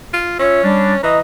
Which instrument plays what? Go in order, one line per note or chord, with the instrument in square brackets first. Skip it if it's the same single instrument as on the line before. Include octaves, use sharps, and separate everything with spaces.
[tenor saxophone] F4
[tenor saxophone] C#4 [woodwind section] F4 C#5 E5
[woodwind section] G3 D4
[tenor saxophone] E3 [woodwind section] D#5 A#5